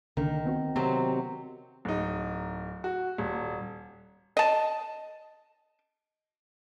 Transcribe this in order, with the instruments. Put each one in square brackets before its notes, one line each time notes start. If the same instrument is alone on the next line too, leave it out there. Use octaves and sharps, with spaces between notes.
[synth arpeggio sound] C2 D3 A#3 [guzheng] D#3
[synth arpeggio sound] B3 C4 F#4
[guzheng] C3 F#3 C4 [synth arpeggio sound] B3 G4
[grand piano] D1 D#4
F#4
D#1
[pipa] D#5 A5